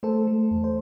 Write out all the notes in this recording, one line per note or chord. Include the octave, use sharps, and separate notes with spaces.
A3 A4 C5
A3
E2
C5